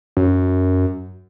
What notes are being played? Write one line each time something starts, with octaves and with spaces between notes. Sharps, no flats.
F#2